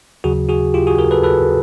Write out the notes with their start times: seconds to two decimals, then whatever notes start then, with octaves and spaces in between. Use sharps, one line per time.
0.24 D#2 C#3 F#3 F#4 G#4
0.49 F#4 G#4
0.74 F4 G4
0.87 F#4 G#4
0.98 G#4 A#4
1.11 A4 B4
1.23 A4 B4